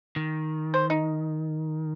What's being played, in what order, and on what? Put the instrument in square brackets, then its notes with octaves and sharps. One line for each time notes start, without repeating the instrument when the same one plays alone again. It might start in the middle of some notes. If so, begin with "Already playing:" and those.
[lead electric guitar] D#3
[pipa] C5
D#4